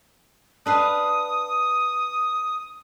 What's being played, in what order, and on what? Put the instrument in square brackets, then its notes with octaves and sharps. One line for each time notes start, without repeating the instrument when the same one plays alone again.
[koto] D4 B4 F5 [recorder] D#6